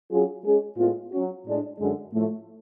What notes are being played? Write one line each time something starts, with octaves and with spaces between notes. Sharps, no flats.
F#3 C#4 F4 G#4
G#3 C#4 G#4
A2 G#3 B3 F4
F#3 C#4 F#4
A2 G#3 D4
F#2 D3 G#3
A2 F3 A3